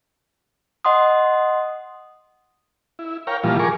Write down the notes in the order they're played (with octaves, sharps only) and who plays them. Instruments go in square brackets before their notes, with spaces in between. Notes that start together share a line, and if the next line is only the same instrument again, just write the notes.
[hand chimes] D#5 F#5 C6 D#6
[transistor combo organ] E4
A#4 C#5 F5 G5
A#2 E3 F3 G3 F4
G#4 A#4 C#6 D6